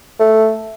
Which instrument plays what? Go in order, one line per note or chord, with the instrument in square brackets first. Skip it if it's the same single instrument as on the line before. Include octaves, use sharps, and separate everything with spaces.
[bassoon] A3